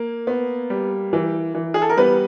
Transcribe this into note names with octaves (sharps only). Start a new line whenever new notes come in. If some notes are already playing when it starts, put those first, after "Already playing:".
Already playing: A#3
B3
G3
E3
E3
G#4
A4
A#4
G3 B3 B4